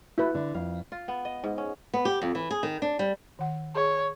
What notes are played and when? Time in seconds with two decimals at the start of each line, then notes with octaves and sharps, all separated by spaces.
0.18 E4 F#4 A4 B4 E5
0.35 D3
0.54 F2 F5
0.92 F4
1.08 B3
1.25 D#5
1.44 G#2
1.58 C#4
1.94 B3
2.05 G4
2.22 F2
2.35 E3
2.51 G#4
2.63 D#3
2.82 D4
2.99 G3
3.39 D#3 F#5
3.75 G#4 C#5